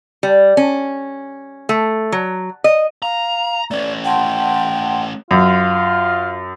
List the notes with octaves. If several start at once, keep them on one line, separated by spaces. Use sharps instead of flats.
G3
C#4
A3
F#3
D#5
F5 A#5
A3 C#4 D5
F#5 G5 A5 C6
F#2 F4